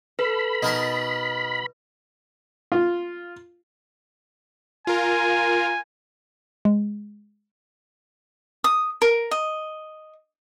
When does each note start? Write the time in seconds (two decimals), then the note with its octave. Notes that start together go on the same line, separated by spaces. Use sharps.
0.19 A4 B4 B5
0.63 B2 D#4 A#4 A5
2.72 F4
4.87 F4 A#4 G#5
6.65 G#3
8.64 D#6
9.02 A#4
9.31 D#5